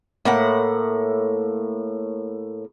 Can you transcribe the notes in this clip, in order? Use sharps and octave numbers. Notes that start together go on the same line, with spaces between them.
A2 A#3 F#5